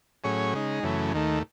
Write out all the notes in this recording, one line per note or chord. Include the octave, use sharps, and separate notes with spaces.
A2 F#3 C#4 G#4 C#5
C#3 G#3 D#4
F#2 C#3 E3 A3
D#2 D#3 A3